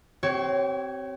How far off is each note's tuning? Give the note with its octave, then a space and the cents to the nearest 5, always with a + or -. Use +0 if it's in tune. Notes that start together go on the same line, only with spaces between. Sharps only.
C4 +0 G4 -45 C#5 +0